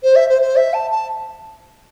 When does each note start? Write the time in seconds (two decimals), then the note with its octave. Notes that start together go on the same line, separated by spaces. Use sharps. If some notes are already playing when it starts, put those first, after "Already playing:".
0.03 C5
0.16 E5
0.29 C5
0.42 C5
0.56 E5
0.74 A5
0.91 A5